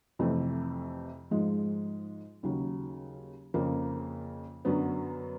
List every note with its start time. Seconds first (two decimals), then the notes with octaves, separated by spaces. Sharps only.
0.19 F2 C3 E3 A3
1.31 G#2 F3 G#3
2.43 D#2 C#3 F#3
3.54 F2 C#3 F3 A#3
4.65 F#2 D3 F#3 B3